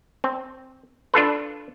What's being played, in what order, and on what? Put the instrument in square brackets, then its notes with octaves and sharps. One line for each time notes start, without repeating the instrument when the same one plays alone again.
[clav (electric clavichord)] C4
D4 F4 A4 B4